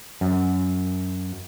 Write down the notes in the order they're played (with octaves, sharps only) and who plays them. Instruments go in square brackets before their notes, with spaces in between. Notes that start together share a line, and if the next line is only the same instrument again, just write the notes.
[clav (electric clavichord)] F#2